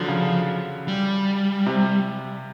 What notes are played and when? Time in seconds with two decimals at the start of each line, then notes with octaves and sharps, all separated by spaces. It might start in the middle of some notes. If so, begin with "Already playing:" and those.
Already playing: D3 F3 F#3
0.08 C#3
0.88 G3
1.66 C3